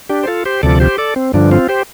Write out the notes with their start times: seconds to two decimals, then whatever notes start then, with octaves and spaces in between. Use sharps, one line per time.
0.09 D4 G4
0.23 C5
0.27 F4 A4
0.45 G4 C5
0.63 D2 C3 F3 A4 D5
0.80 G4 C5
0.98 A4 D5
1.16 C4
1.34 G2 D3 F3 D4
1.51 C4 F4
1.69 G4 C5